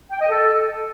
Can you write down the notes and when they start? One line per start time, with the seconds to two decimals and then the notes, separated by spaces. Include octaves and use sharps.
0.11 G5
0.21 D#5
0.30 A4